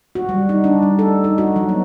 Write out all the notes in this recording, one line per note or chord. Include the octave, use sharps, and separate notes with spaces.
F#4
G3
D#4
D4
G3
A4
D#4
F#4
F#3
B3